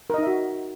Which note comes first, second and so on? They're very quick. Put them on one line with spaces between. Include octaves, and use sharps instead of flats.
A#4 D#5 D#4 E5 F#4